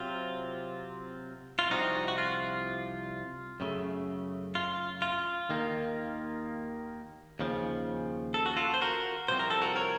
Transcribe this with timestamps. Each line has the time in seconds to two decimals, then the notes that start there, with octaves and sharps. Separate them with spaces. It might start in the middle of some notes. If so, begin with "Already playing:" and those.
Already playing: C3 F#3 C4 F4
1.59 F4
1.70 C2 C3 F3 C4 D#4 F#4
2.08 F#4
2.18 F4
3.60 F#2 C#3 A3
4.55 F4
5.02 F4
5.49 D#2 D#3 A#3
7.39 D#2 C#3 F3
8.34 A4
8.46 F#4
8.57 F4 A4
8.74 C5
8.82 F#4 A#4
9.28 C2 C3 F3 C4 C5
9.39 A#4
9.50 A4
9.62 F#4 A#4
9.76 A#4 C#5